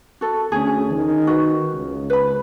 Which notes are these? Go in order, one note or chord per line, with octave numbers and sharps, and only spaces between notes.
F#4 A4
D2 C#4 G#4
D#3
F#4 B4
C#2
B4 B5